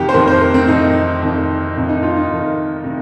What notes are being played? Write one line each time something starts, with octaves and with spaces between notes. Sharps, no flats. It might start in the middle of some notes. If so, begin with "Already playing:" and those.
Already playing: F2 C3 D#3 G4
C5
F2 C3 D#3 A#4
C5
A#4
C4
F2 C3 D#3 D#4
F2 C3 D#3
F2 C3 D#3
D#4
F4
D#4
F2 C3 D#3
C3 D#3